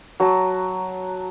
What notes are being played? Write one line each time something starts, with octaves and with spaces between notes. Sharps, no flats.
F#3 A5 A#5